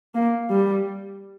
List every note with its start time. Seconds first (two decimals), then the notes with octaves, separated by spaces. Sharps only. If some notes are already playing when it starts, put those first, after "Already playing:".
0.15 A#3
0.50 G3